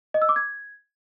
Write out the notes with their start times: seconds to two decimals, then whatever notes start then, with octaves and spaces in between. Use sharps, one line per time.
0.14 D#5
0.22 E6
0.29 D6
0.36 G#6